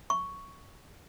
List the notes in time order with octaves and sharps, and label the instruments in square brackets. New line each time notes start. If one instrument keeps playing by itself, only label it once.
[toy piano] C#6